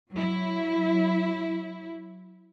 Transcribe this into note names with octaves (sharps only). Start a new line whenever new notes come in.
F#3 E4